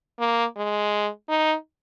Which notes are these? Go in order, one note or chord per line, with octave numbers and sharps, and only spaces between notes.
A#3
G#3
D#4